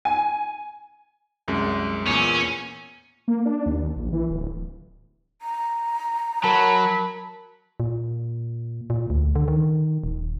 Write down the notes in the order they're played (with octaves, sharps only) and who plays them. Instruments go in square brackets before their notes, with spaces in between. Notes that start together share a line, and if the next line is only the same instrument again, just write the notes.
[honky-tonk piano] G#5
[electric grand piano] C2 F#2 G#3
[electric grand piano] E2 A#2 [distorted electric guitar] C#4
[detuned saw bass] A#3
D4
D#2
A#1
E3
D1
[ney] A#5
[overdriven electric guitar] F#3 [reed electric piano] A#4 A5 [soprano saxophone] B5
[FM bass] A#2
A#2
D2
D3
D#3
D#1